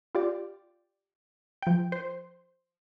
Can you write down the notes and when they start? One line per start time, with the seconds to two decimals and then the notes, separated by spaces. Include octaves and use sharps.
0.15 F4 G4 D5
1.62 F3 G5
1.92 C5